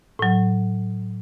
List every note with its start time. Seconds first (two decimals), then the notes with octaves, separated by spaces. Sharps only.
0.19 A2 F#3